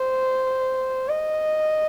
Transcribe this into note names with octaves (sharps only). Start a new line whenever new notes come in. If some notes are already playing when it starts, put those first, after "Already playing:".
Already playing: C5
D#5